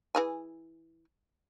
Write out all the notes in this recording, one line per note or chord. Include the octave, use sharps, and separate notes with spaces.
E3 G#4 G#5